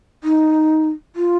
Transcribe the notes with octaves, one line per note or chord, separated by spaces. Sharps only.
D#4
F4